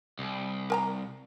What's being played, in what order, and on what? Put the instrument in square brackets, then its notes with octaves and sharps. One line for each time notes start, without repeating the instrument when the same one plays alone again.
[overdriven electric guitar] C2
[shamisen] A#4 G#5 A#5